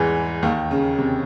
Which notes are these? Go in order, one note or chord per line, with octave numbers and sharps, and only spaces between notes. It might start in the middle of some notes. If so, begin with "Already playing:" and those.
Already playing: E2 G#2 E3 G#3
D#2 D#3
C#3
C3